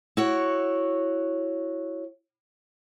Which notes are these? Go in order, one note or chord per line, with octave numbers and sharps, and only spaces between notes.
E4 F#4 C#5